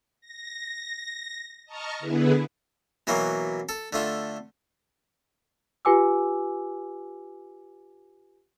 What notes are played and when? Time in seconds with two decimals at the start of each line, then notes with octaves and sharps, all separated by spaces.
0.21 A#6
1.65 D#5 A5 A#5 C#6 F6
1.99 D3 B3 E4 G#4 B4
3.07 B2 E3 F#3 A#3
3.69 A4
3.93 D3 A3 F4
5.85 F4 G4 B4 G#5 D6 E6